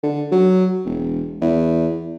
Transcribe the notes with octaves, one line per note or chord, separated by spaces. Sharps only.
D3
F#3
E1
E2